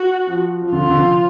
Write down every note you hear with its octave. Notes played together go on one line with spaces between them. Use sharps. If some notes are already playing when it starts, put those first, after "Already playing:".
Already playing: F#4
F3
F3
D3 F4
D3
F3